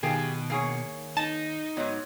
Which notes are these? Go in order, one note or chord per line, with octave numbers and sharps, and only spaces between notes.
B2 D#3 F4 G4 G#4
A#3 G#4 C#5
D#4 A5
G#2 F#3 B3 C#5 D#5